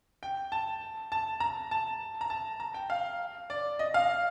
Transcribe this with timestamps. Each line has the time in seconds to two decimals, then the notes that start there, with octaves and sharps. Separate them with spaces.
0.23 G5
0.52 A5
1.12 A5
1.40 A#5
1.71 A5
2.21 A#5
2.30 A5
2.60 A#5
2.74 G5
2.90 F5
3.50 D5
3.79 D#5
3.94 F5